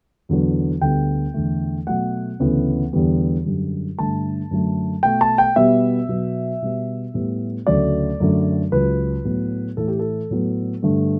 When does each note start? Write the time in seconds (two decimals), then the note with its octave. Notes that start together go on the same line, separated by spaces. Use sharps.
0.29 E2 D3 F#3 B3
0.81 D2 D3 G3 B3 G5
1.34 E2 D3 A3
1.87 B2 F#3 A3 F#5
2.40 D2 C#3 E3 B3
2.93 E2 D3 G3 B3
3.45 F#2 D3 G3
3.98 G2 D3 A3 A5
4.51 F#2 D3 F#3 A3
5.03 B2 A3 G5
5.21 A5
5.38 G5
5.56 B2 G3 B3 E5
6.08 B2 F#3 B3
6.62 B2 G3 B3
7.14 A2 G3 B3
7.67 D2 C#3 F#3 A3 D5
8.20 F#2 D3 F#3 A3
8.72 C#2 C#3 F#3 B4
9.25 A2 F#3 B3
9.77 A2 E3 A3 A4
9.88 G4
9.99 A4
10.31 A2 F#3 B3
10.82 G2 D3 A3